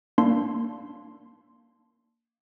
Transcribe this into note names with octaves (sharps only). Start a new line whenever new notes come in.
A#3 D4 C6